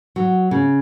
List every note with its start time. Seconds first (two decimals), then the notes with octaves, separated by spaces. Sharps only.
0.16 F#3
0.51 C#3